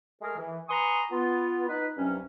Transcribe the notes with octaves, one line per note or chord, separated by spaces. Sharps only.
G#3 A3 G#4 A#4
E3
B4 G#5 A#5 C6 C#6 D#6
B3 F4
D#4 B4
C2 G2 F#3 C#4